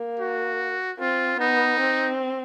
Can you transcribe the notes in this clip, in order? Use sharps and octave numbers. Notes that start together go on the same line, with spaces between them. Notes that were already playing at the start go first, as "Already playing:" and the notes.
Already playing: A#3
F#4
C4 F4
B3 D#4
C4